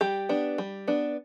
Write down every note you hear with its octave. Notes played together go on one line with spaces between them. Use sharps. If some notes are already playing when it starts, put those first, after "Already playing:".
G3 G4
B3 D4
G3
B3 D4